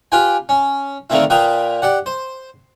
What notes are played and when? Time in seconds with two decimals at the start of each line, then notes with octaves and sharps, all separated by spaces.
0.12 F4 G4 B4 G5 G#5
0.49 C#4
1.10 D3 D#3 A3 A#3 C4 E4
1.30 A#2 A#3 B4 G5 D#6
1.82 G4 D5 F#5
2.06 C5